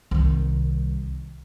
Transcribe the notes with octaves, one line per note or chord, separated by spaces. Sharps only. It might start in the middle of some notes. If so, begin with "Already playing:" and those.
C2 D#3